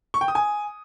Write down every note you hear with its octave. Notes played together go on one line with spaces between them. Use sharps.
C#6
G5
D#6
G#5